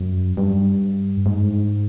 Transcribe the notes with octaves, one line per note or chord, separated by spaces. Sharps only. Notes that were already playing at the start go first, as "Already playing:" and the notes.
Already playing: F#2
G2
G#2